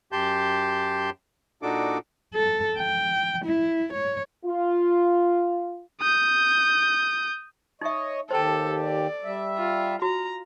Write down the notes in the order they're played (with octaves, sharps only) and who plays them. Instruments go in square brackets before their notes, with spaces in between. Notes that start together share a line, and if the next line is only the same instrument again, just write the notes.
[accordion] F#2 G4 A5 C6 G6
A#2 D4 D#4 F#4 A4 D6
[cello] A4
G5
E4
C#5
[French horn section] F4
[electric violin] D#6 G6
[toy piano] D#4 E5 [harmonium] C#5 D#5
[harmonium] D#2 G4 [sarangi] A4 [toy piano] C5 A5
[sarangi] D5
[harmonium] G3 E5
[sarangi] F4
[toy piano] F#4 [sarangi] A#5